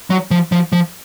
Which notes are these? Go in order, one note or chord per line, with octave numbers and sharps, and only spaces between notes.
F#3
F3
F3
F3